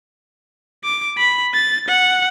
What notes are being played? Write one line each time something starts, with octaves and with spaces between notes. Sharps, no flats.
D6
B5
A6
F#5